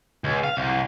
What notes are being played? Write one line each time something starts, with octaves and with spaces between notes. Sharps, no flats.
C#2
F5
C2